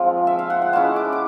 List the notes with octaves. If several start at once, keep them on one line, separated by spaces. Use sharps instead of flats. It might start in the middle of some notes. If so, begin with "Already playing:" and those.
Already playing: F3 G#3 C4 F4
E5
F5
F#5
F#5
G#3 C#4 E4 A5
D6
D6